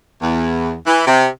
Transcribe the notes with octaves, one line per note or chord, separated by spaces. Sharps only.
E2
E3
C3